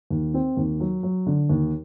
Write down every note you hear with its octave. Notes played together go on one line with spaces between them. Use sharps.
D#2
C4
D#2
F#3
F#3
D3
D#2